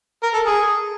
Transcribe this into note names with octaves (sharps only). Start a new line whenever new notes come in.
A#4
A4
G#4